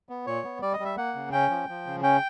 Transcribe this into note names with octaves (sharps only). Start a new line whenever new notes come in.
B3
A#2 C#5
B3
G3 D5
D#5
G3
E5
A#3 F#5
C#3
C#4 G5
F3
F3
C#3
C#4 G5